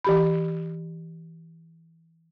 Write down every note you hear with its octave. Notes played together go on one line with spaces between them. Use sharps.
E3 G4 B5